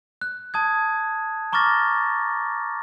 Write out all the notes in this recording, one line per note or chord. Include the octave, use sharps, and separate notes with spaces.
F#6
A5 D#6 G#6
A#5 C#6 D6 F6 A6 A#6